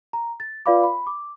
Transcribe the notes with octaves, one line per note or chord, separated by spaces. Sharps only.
A#5
A6
F4 B4 D5 F5 B5 D6
B5
D6